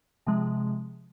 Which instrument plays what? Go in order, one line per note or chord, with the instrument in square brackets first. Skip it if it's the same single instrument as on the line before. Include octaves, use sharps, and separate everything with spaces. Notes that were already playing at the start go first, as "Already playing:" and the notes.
[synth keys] C3 F3 G#3